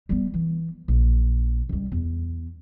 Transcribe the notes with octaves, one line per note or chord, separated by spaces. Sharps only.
G3 B3
E3
A#1
C#2 G3
E2